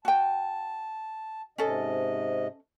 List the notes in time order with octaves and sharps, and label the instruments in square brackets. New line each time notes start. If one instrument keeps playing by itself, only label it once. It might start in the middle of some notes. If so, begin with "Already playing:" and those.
[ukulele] F#4 G5 [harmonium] A5
[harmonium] G#2 C3 D#5 [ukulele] C#4 A4